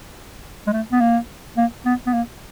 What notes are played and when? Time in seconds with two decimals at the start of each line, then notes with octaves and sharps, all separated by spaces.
0.67 G#3
0.73 A3
0.92 B3
1.00 A#3
1.57 A#3
1.85 B3
2.06 B3
2.13 A#3